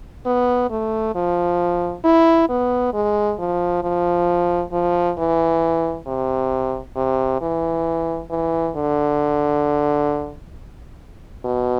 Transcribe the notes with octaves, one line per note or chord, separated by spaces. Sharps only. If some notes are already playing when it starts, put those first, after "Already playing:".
B3
A3
F3
E4
B3
G#3
F3
F3
F3
E3
C3
C3
E3
E3
D3
B2